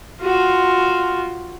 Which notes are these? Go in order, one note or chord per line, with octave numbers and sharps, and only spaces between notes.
F4 F#4